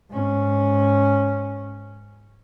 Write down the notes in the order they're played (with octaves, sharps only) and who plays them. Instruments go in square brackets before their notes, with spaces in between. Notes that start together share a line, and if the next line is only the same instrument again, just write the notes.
[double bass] G#2 C#4